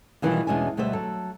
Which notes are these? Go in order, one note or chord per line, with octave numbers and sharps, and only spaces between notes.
B2 D#3 E3 F#3 G3 F4
E2 B2 G#3 C#4 D4 G#5
D2 B2 G3 B3 C5 E5
F#3 A4